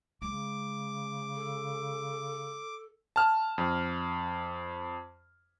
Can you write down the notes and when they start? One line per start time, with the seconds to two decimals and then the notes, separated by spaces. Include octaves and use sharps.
0.22 C#3 G#3 D6
1.35 A4
3.16 A5 F6
3.58 F2